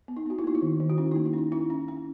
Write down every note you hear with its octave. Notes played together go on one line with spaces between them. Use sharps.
B3
D#4
B3 F#4
E4
A#3 D#4
E4
D#3
D#3
F#4
C#4 E4
A#3 D#4
E4
C#4 D#4
C#4 E4
C#4
C#4